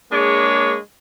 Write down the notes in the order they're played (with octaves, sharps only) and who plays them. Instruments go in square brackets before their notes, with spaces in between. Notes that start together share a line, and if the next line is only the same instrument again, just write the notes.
[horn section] G#3 A#3 D4 G#4 C#5